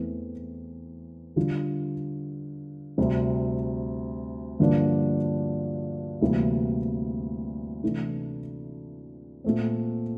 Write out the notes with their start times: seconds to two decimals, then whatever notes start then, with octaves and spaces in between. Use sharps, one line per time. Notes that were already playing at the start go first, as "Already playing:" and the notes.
Already playing: E2 E3 A3 C4
1.36 D3 G3 D4 F4
2.98 D2 C3 G3
4.59 G2 D3 F3 A#3 D4
6.21 D2 C3 E3 G3 A#3
7.83 C3 E3 A3 D4
9.44 A#2 A3 C4